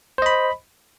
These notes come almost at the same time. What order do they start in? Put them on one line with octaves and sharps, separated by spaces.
C5 D#5 B5